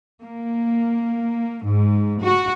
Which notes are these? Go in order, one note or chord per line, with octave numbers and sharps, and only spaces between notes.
A#3
G#2
F#4